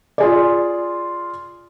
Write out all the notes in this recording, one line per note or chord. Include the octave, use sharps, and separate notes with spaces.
F4 G#4 D5